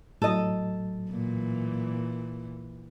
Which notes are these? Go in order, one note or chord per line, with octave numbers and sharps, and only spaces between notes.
A2 F#3 A4 D#5
A#2 E3